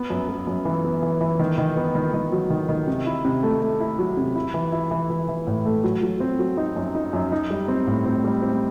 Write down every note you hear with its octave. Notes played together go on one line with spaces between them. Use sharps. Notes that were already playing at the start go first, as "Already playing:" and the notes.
Already playing: B3
F#2
B3
F#2
E3
B3
E3
E3
D#3
D#3
B3
D#3
D#3
F#3
D#3
D#3
C3
E4
C3
A3
A3
E4
F#3
C3
E4
E3
E4
E3
E3
E3
A2
A3
F#3
F#3
C4
F#3
D#4
F#2
D#4
F#2
D#4
G3
C4
A2
C4
G3
C4